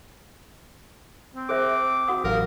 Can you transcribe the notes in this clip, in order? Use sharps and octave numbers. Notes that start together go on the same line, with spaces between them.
C4
G#4 C5 E5 D6
F#4 F#5 D#6
A1 F#3 A#4 F5